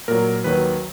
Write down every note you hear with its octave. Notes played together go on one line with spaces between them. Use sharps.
A#2 F#3 A#4
D#2 D#3 F#3 B4